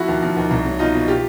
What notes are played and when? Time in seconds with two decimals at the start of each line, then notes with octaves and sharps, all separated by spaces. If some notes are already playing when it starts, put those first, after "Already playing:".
Already playing: F3 E4 F#4
0.08 D#2
0.22 F3
0.37 D#2
0.51 C2
0.66 F#3
0.79 B2 D#4 F4
0.94 B2
1.08 F4 G4